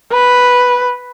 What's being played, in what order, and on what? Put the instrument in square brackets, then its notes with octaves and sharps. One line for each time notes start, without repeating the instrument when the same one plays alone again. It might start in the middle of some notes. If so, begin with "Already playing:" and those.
[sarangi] B4